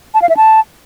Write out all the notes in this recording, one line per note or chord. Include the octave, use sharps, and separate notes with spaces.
A5
F5
E5
A5